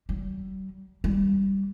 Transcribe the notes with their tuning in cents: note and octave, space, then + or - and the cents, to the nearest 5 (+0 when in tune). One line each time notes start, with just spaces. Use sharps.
G3 -45
G3 +0